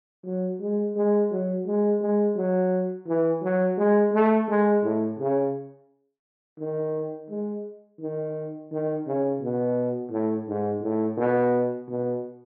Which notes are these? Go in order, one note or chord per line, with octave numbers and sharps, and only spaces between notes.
F#3
G#3
G#3
F#3
G#3
G#3
F#3
E3
F#3
G#3
A3
G#3
A2
C#3
D#3
G#3
D#3
D#3
C#3
B2
A2
G#2
A2
B2
B2